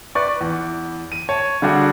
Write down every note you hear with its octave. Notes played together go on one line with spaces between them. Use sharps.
B4 D5 C#6
E2
D#7
C#5 A5
D3 G3 D4 F#4 G#4